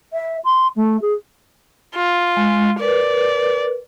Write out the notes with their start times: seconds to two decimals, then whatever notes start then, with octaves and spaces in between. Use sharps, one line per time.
0.13 E5
0.44 C6
0.76 A3
1.02 G#4
1.96 F4
2.37 G#3
2.80 A#4 B4 D5